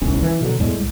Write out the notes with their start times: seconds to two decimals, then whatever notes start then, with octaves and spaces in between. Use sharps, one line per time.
0.02 D1 G1 C2 C#4
0.22 E3
0.41 B2 D3 F#3
0.59 E2 A2 G3 G#3
0.77 C2